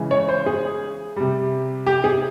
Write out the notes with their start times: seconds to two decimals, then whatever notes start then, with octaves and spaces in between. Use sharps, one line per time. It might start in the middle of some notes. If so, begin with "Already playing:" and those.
Already playing: C#3 E3 G#3
0.11 C#5
0.29 C5
0.46 G#4
1.16 C3 G3
1.86 G4
2.04 G#4